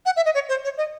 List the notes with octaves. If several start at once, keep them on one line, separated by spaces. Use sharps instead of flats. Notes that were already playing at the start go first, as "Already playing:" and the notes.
F#5
E5
D#5
C#5
C5
C#5
D#5